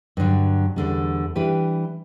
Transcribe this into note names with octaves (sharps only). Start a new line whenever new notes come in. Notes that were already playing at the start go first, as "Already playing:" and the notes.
G2 D3 F#3
E2 D3 G3
E3 G3 D4 G4 B4